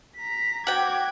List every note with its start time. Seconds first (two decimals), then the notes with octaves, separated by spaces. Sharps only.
0.17 A#5 B6
0.67 F#4 G5 D6 G#6